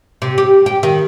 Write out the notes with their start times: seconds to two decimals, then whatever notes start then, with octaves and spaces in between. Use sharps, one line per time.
0.22 C3
0.38 G4
0.66 G4
0.83 D#3